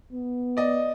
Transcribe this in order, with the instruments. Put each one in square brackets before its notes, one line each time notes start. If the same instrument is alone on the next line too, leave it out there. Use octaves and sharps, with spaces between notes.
[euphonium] B3
[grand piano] D5 D#5